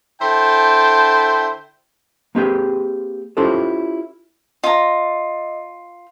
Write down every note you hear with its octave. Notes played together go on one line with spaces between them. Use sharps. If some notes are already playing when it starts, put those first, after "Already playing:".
D3 E4 C5 G5 A5
A#3 C4 G4 G#4 B4 G5
C#4 E4 F4 G4 A4 C5
F4 D#5 A#5